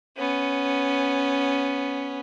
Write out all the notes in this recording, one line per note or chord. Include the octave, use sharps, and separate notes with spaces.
B3 C#4